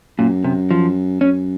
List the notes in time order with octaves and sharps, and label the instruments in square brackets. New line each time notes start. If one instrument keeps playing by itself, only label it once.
[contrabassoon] F#2 [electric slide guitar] A#2
[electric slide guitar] C3
F3
[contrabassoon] F#2 [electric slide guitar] C#4